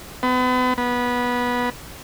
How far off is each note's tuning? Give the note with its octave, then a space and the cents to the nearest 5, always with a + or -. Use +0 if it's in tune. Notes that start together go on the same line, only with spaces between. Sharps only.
B3 +35
B3 -15